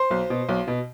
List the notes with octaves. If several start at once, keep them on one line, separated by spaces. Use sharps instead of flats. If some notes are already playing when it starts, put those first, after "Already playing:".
Already playing: C5 C6
B1
B2
B1
B2